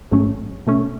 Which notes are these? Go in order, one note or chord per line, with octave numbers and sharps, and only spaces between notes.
A1 G#2 F#3 A3 C#4
B2 A3 C#4